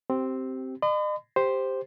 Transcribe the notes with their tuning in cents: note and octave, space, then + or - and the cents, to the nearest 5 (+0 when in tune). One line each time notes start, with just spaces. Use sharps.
C4 +0 G4 -20
D#5 -40 B5 +45
G4 +5 C5 +0